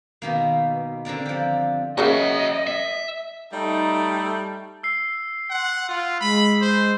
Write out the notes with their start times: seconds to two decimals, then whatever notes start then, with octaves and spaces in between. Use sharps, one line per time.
0.22 B2 D#3 A#3
1.05 D3 C4 A#4 D5
1.25 F3 G4
1.98 C#3 F#3 A#3 F#4 D#5 E5
2.67 E5
3.53 G3 A3 D#4
4.83 E6 C7
5.50 F#5 C6
5.89 F4
6.21 G#3 B5
6.61 C5